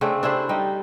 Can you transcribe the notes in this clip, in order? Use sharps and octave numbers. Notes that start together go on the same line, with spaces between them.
C#3 A3 C4 D4
D4 E4 G4 C5
G3 D#4